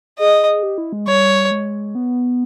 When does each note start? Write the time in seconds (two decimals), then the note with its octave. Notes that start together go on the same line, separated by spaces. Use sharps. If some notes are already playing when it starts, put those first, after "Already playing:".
0.19 G#4 D#5
0.63 G4
0.78 E4
0.93 G#3
1.07 G3 C#5
1.51 G#3
1.95 B3